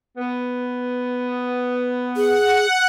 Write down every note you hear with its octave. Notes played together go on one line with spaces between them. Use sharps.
B3
G#4 F#5